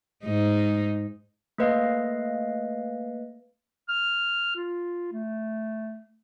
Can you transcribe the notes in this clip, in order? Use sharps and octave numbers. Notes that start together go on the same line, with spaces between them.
G#2 D#4
A3 A#3 B4 D#5 F5
F6
F4
A3